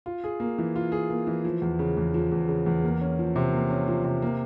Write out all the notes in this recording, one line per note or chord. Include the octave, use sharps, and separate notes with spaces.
F4
G#4
A#3
E3
F4
G#4
A#3
E3
F3
E2
C#3
E2
F3
E2
C#3
E2
A#3
C#4
F3
C3
A#3
C#4
F3
C3
A#3